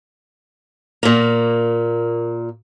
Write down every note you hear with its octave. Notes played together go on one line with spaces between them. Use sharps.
A#2 A#3